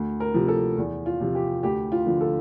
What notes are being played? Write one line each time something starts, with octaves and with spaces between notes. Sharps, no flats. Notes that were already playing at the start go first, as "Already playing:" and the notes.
Already playing: D2
A#4
C3 F3
A4
E2
F4
C3 F3
G4
D2 G4
F4
D3 F3
A4